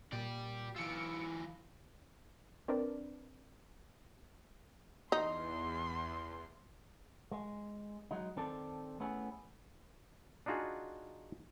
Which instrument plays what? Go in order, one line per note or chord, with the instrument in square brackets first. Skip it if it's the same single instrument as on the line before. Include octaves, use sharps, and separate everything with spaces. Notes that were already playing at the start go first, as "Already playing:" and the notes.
[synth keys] A#2 [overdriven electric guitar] G4 D5
[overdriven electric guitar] E3 F4 [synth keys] E6 C#7 D7
[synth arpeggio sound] C4 D4 A#4 B4 D5
[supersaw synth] E2 [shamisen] D#4 [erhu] C6
[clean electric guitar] G#3
F#3 G#3 D#4
D#3 C4 A4 D5
A3 B3 C#4 E4 G#4
[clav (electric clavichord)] D4 D#4 F4 F#4 G#4